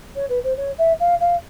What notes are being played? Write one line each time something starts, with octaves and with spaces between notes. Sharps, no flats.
C#5
B4
C5
C#5
E5
F5
F5